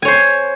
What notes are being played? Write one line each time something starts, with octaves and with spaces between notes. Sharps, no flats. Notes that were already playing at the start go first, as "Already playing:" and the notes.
C5 C#5 G#5